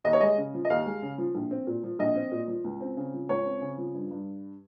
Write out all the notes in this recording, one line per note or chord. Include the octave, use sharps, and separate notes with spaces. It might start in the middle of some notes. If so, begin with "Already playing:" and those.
D#2 D#5
C#5
G#3 D#5
C#3
F3
D#5
D#2 F5
G#3
C#3
F3
A#1
C4
A#2
F3
A#1 D#5
C4
A#2
F3
C#2
C4
C#3
F3
C#2 C#5
C4
C#3
F3
G2
G2